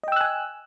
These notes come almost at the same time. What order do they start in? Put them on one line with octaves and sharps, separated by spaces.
D#5 G5 E6 F#6 G#5